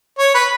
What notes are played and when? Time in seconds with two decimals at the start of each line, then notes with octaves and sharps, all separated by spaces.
0.18 C#5
0.34 B4